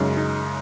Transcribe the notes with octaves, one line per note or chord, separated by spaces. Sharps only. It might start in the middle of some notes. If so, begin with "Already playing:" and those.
Already playing: F#2 C#3 G#3 D#4
D#4